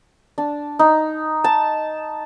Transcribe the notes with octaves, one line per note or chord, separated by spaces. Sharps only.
D4
D#4
A5